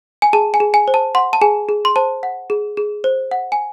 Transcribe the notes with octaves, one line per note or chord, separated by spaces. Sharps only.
G#5
G#4 A5
G#5
G#4
G#5
C5
A5
F#5 C6
A5
G#4 G#5
G#4
C6
C5 A5
F#5
G#4
G#4
C5
F#5
G#5